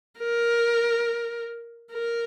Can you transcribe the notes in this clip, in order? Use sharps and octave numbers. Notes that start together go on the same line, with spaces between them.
A#4
A#4